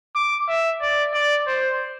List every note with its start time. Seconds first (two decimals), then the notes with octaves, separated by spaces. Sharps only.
0.16 D6
0.48 E5
0.81 D5
1.14 D5
1.47 C5